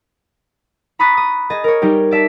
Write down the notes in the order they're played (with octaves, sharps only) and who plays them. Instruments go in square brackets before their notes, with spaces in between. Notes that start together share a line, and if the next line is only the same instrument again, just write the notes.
[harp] A#5 B5 C#6 D#6 F#6 A6
D#6
G#4 D#5 A6
A#4 C#5
G3 D#4 G4
D5 E5 A5